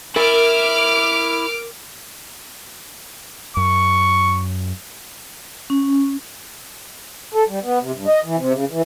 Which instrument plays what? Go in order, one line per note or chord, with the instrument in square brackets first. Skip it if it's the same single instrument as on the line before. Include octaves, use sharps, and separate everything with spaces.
[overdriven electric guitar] E4 [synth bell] A#4 [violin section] D6 F6
[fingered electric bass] F#2 [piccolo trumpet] C#6
[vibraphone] C#4
[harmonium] A4
G3
B3
C3
G2
D#5
E3
C3
C#3
E3